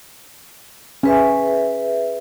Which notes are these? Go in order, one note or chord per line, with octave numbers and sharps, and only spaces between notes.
C#4 G#4 B4 E5